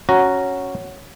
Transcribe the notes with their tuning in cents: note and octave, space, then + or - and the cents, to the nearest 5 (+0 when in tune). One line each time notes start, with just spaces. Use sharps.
C#4 +0 F#4 +0 A#5 +0